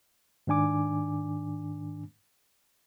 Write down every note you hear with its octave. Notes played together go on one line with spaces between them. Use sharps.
G#2 D#3 D4 G#5 D6